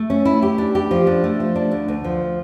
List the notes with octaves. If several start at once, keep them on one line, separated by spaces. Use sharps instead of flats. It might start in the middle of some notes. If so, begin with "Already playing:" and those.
Already playing: A3
C#4
E4
G4
D4
G4
F3
D4
A3
F3
D4
D2
D2
F3